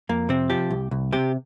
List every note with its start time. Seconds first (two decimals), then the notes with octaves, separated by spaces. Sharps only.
0.09 F2 A#3
0.29 C3 C4
0.50 F3 G4
0.71 C2
0.91 C2
1.13 C3 G4